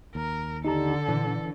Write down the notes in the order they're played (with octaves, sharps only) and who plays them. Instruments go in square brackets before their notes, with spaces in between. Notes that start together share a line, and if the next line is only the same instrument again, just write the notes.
[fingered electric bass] D#2 [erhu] A#4
[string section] D3 [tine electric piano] D#4 G4 A#5 [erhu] A4
[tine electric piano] A#2 [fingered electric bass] E3